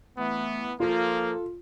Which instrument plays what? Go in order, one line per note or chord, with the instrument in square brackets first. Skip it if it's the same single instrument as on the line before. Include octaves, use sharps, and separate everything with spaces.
[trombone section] E3 B3 [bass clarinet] A3
[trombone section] F3 A#3 [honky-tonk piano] F4 [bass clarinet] A4